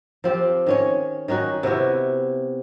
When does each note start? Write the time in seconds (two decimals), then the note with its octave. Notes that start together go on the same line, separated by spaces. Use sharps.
0.24 F3 C4 G4
0.66 D#3 C#4 C#5
1.28 D#3 C#4 D#4 F#4
1.63 C3 B3 E4 F#4